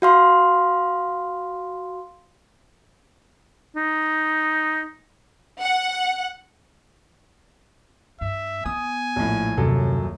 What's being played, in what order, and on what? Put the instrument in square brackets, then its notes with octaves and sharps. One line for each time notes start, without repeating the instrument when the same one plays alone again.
[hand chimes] F#4 F5 C6
[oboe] D#4
[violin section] F#5
[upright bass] G2 [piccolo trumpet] E5
[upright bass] B3 [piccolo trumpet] G#5 [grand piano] D#6
[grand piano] A#1 A2
[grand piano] D#1 F#2 A4 [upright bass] C3